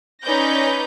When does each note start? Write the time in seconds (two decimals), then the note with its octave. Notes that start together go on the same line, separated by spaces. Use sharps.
0.22 C#4 D#4 B4 D5 G6 A#6